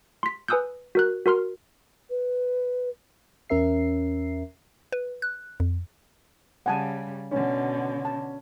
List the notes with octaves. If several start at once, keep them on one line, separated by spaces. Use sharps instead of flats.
C6 B6
B4 G#5 D#6 E6 F#6 G6
F#4 A#4 F#6
F#4 A#4 C6 F6
B4
E2 C#4 A#4 E5 C7
B4
F#6
F2
C#3 G3 F#5 G#5 A5
B2 D3 C#4
A5